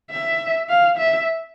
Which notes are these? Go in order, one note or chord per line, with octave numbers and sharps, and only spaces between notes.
E5
F5
E5